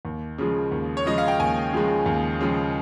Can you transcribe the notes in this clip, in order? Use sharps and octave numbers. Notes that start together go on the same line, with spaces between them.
D#2
C#3 F3 G#3
D#2
C#5
C#3 F3 G#3 D#5
F5
G5
D#2 G#5
C#3 F3 G#3
D#2
C#3 F3 G#3